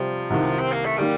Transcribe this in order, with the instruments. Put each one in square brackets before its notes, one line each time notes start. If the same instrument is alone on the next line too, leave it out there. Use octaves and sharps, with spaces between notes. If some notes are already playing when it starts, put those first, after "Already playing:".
Already playing: [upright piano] C3 G3 C4 [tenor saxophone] F3
[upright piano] C2 C3 D#3
[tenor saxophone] C4
A#3
A3
[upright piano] D#3 A#3 [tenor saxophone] G3